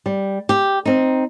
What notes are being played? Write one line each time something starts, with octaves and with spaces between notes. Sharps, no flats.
G3
G4
C4 D#4